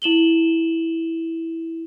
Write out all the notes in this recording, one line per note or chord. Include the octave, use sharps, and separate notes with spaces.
E4 E7 F#7 G7